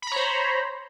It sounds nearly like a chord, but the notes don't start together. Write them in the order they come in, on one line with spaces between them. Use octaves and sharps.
B5 A#5 C#5 C5